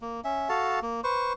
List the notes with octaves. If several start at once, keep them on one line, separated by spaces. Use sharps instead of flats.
A#3
C#4 E5
F#4 A4 F5 A5
A#3
B4 C5 C#6